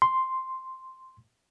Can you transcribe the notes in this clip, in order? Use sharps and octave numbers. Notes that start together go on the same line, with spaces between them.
C6